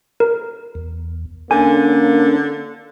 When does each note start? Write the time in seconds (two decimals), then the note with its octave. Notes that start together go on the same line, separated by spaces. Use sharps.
0.20 A#4
0.75 E2
1.51 D3 A#3 C#4 D4 G#5